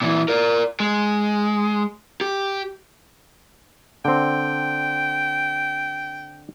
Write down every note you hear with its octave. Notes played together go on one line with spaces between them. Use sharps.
A#2 E3
A#4 D5
G#3
G4
D3 C4 G5